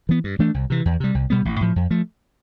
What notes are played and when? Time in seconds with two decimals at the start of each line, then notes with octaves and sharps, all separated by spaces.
0.09 E3 B3
0.24 G2
0.39 E3 A3 D4
0.54 C2
0.70 C3 E3
0.85 E2
1.00 C3 G3
1.15 C2
1.30 B2 G3 B3
1.45 A1
1.61 A2 F3
1.76 F2
1.91 F3 A3